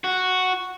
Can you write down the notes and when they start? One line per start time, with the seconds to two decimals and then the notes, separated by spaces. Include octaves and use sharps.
0.04 F#4